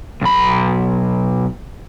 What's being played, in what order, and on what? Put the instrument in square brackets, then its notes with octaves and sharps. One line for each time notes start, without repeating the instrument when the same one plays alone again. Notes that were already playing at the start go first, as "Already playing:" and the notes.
[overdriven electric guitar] B1 B5